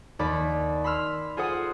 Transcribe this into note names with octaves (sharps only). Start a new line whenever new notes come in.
D#2 D5 B5
B5 C6 E6 F6
F4 G#4 A4 C5 F#5 D#6